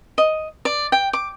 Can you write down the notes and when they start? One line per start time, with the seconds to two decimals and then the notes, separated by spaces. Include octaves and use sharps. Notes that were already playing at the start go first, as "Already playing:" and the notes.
0.18 D#5
0.65 D5
0.92 G5
1.13 D6